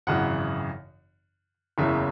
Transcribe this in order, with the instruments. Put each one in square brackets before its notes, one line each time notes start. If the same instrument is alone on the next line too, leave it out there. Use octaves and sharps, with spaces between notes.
[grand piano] G#1 F#2 C#3 E3 F#5
F#1 E2 C#3 E3 E5